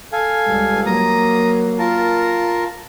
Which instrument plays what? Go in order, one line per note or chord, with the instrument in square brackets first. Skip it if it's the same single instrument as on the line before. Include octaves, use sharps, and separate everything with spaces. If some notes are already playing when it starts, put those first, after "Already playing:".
[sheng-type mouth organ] A4 F5 G#5
[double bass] C#2 G3
[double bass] F#3 A#3 [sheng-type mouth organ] A#5 D#6
[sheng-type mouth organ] F4 A#4 A5